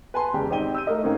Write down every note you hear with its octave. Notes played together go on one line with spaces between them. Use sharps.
B4 G#5 A5 C6
E1 C#3 G4
G#1 C4 D#4 G4 D#7 G7
E6 G6 D#7
A3 A#4 D#5
G#2 A#3 C4 C#4 D#4